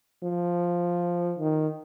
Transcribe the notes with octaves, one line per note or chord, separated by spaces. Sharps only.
F3
D#3